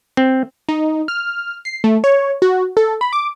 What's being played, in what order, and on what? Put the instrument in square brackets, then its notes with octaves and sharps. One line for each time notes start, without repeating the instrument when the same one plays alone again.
[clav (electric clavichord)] C4
[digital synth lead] D#4
F6
C7
A3
C#5
F#4
A4
B5
D6